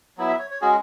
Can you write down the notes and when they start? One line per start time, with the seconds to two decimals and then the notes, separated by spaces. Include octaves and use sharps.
0.17 F#3 B3 E4
0.28 E5
0.39 C#5
0.51 C#5
0.61 G#3 C#4 F#4 G#4